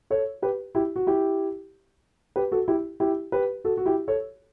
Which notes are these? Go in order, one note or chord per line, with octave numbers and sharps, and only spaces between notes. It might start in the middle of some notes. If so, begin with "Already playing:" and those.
A4 C#5
G4 B4
E4 G4
F#4
E4 G4
G4 B4
F#4 A4
E4 G4
E4 G4
G4 B4
F#4 A4
F#4
E4 G4
A4 C#5